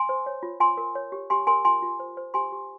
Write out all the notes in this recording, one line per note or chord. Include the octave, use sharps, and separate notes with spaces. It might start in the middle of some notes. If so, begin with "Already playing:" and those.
Already playing: G#5 C6
C5
C#5
F4
F4 G#5 C6
A#4
C#5
G4
G4 G#5 C6
A#4 G#5 C6
F4 G#5 C6
F4
C5
C5
G4 G#5 C6
G4